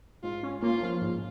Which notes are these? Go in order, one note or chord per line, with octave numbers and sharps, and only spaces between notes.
G#2 F4
C#4
A#3 F4
F3
G#2